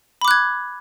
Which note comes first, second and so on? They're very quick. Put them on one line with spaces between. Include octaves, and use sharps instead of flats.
B5 D6 F#6 G#6